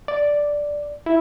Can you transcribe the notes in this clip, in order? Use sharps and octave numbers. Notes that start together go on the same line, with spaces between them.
D5
E4